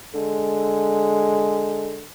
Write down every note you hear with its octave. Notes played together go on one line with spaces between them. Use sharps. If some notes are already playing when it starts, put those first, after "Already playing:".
D3 G#3